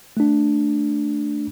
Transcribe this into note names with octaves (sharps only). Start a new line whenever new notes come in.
A3 D4